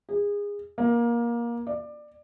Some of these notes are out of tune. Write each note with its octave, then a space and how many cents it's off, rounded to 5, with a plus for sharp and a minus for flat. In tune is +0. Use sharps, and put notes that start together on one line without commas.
G#4 -25
A#3 +20
D5 +20